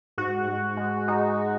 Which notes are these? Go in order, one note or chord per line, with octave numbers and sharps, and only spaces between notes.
G#2 F#4
G#2
G#3
G#3 D#4